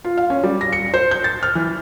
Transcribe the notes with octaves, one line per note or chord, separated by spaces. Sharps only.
F4
F5
C#4
G3
A#6
C#7
C5
G6
A6
F6
E3